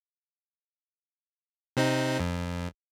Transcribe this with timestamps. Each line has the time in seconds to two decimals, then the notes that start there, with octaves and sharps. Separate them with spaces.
1.77 C3 C4 D#4
2.20 F2